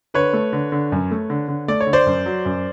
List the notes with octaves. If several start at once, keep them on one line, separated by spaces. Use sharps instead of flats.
D3 B4 C#5
A3
D3
D3
F#2
A3
D3
D3
A3 D5
C#5
D3
C5 D5
F#2
F#3
F#2